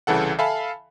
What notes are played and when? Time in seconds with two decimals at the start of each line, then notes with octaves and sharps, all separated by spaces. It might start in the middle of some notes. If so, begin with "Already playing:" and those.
0.07 C2 C#3 E3 A4 F#5
0.39 A4 E5 F5 G#5 A5 B5